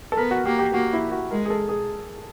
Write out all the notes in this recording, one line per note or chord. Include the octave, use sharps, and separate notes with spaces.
A4
B3 A#4
F#4
A#3 G4
G4
A#3 F#4
E4
F#4
G#3 A#4
G#4
A4
G#4